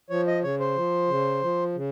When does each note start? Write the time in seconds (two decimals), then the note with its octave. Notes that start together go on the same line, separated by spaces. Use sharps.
0.10 F3 C#5
0.27 D#5
0.44 C#3 C#5
0.60 C5
0.77 F3
1.09 C#3
1.43 F3
1.76 C#3